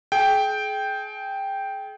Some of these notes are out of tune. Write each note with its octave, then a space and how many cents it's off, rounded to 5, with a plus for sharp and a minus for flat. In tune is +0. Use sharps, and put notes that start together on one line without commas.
G#4 +35 G5 +0